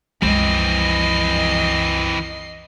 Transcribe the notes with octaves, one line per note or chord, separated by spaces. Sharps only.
C2 F#2 E3 F3 G#3 C4 D#5 C7